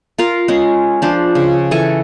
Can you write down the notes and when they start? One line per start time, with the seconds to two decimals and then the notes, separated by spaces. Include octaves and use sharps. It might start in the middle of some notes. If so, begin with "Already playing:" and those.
0.18 F4 A#4 F5
0.48 G#3 C#4 G#4
1.02 F3 D4 C5
1.35 C#3
1.71 E3 A4 G#5 C#6